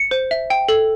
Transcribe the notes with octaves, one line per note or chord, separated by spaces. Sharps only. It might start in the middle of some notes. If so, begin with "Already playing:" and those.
Already playing: C#7
C5
E5
G5
A4